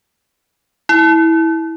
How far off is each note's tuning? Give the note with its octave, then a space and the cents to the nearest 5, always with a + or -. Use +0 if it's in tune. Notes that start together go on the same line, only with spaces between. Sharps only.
E4 -20